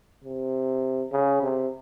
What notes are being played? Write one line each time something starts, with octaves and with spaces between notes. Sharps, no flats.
C3
C#3
C3